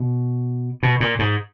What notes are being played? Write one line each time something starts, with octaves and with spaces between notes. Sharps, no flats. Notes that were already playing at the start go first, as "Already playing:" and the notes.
Already playing: B2
B2
A#2
G#2